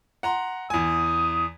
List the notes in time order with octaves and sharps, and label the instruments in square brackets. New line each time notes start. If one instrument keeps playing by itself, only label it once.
[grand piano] F#5 A#5 C6
[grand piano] E2 G#5 [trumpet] D#6